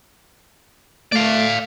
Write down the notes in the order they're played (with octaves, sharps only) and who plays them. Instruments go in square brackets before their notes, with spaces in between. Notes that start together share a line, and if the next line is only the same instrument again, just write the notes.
[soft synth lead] A3 [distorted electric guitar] D5 F5